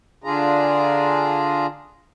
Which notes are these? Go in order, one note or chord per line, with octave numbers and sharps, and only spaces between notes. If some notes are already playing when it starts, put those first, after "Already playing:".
D3 D4 F4 G#4 A#5